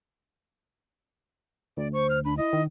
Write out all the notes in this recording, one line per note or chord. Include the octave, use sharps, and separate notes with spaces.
D2 D5
C5 C#6
F6
D4 B5
E4 D#5
D#3